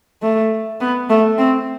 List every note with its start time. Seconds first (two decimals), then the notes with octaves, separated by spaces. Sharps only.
0.22 A3
0.81 B3
1.10 A3
1.38 C4